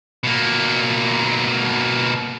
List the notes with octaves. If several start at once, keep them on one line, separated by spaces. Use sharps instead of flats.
B2 A#3